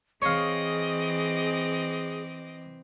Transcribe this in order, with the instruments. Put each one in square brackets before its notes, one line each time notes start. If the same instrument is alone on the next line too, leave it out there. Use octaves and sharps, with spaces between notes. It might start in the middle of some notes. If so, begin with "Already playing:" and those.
[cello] E3 C4 [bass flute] G#4 [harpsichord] C#5 F5 [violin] D#5 D6